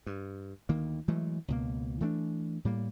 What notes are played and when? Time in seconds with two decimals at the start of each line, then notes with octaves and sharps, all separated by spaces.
0.06 G2
0.69 D2 D#3 A#3
1.08 E3 F#3 G#3 A3
1.48 C#2 B2 A#3
2.01 E3 A3 A#3 D4
2.65 A2 G3 A#3